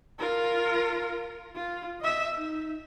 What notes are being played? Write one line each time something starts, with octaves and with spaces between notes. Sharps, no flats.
F4 A#4
F4
D#5 E5
D#4